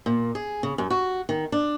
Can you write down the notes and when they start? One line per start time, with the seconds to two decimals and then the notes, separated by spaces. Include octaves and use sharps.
0.06 A#2
0.35 G#4
0.63 C#3
0.78 F#2
0.90 F#4
1.29 D#3
1.52 D4